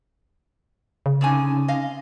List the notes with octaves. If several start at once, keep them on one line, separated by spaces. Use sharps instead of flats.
C#3
A#2 D3 C4 C#4 D#4 G#5
D#5 F5